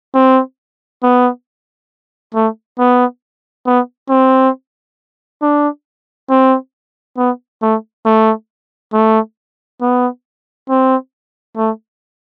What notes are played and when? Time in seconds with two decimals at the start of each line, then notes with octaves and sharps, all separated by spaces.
0.15 C4
1.03 B3
2.34 A3
2.79 B3
3.66 B3
4.09 C4
5.42 D4
6.30 C4
7.17 B3
7.62 A3
8.06 A3
8.93 A3
9.81 B3
10.69 C4
11.57 A3